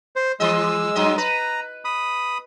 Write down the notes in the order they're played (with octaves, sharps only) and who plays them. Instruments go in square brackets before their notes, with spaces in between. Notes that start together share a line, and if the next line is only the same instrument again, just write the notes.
[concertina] C5
[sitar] E3 D#5 [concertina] G#3 E6
[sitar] G2 F#3 D#5
[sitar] B4 [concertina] A#5
[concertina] B5 D#6